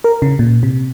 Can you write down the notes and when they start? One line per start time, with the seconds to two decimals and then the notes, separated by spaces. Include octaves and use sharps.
0.04 A#4
0.22 C#3
0.39 A#2
0.63 C3